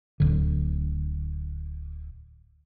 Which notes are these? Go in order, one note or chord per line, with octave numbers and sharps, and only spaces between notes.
D1 D3